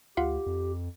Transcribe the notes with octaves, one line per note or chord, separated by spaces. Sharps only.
D2 F4 G4 F5 F#5
F2